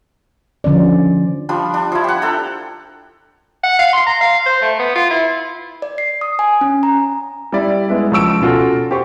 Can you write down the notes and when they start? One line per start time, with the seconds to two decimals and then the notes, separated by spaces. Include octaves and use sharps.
0.64 D3 F3 C#4 D5
1.49 F3 G3 D4
1.74 D4
1.92 F3 E4
2.04 G4 F#5
2.22 A4 G5 A#5
3.63 F#5
3.79 F5
3.93 C6
4.06 A#5
4.21 F5
4.46 C5
4.62 A3
4.79 B3
4.95 F4
5.11 E4
5.82 D5
5.98 C7
6.21 D#6
6.39 G#5
6.61 C#4
6.83 A#5
7.53 G3 E4 D5
7.89 G#3 B3 E4
8.12 C#2 F3 C#6 E6 D7
8.41 B2 C#4 F4 F#4 A4
8.91 G4 C5 C#6